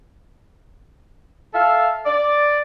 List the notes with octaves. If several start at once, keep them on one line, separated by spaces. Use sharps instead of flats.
A4 E5 F5
D5